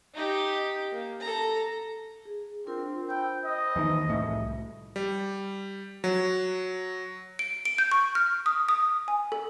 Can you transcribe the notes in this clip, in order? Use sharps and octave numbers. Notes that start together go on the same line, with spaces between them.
D#4 G4
A#3
A4 A#5
G#4
C4 D4 F4 A#4
C5 G5 B5 E6
D#5
E2 D#3
C2 A2
G3
F#3
D7
D7
G6
C#6
F6
D#6
D#6
G#5
A4